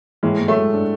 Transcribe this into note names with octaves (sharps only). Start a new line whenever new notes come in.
A2 E3 G#3
A2
F#3 A3
G#3
D4